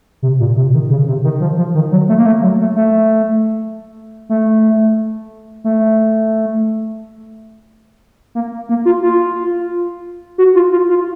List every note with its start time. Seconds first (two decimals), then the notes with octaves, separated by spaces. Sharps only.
0.22 C3
0.40 A#2
0.56 C3
0.74 D#3
0.90 C#3
1.08 C3
1.24 D#3
1.40 F3
1.57 F3
1.75 D#3
1.91 F#3
2.09 A3
2.18 A#3
2.26 A3
2.42 F#3
2.60 A3
2.76 A3
4.29 A3
5.64 A3
8.35 A#3
8.69 A#3
8.85 F4
9.02 F4
10.38 F#4
10.55 F4
10.72 F4
10.89 F4